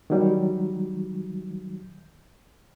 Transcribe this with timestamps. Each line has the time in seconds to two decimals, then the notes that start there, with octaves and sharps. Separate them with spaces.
0.10 D#3 E3 F#3 G3